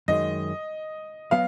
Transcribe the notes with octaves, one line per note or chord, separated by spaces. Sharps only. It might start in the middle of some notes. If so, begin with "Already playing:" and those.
F#2 D#3 G#3 D#5
F#3 B3 F5